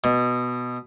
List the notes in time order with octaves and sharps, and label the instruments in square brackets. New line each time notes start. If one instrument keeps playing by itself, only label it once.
[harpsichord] B2